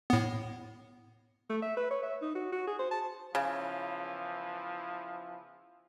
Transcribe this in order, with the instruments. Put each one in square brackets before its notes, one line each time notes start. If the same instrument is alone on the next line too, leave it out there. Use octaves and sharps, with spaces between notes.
[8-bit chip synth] A2 B3
[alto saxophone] A3
E5
B4
C#5
E5
D#4
F#4
F#4
G#4
C5
A5
[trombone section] E2 E3 F3 [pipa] C#3